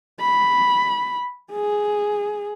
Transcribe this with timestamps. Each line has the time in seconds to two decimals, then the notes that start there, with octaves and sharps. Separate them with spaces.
0.20 B5
1.52 G#4